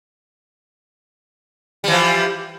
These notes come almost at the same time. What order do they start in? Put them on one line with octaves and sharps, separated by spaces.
G3 E3 F3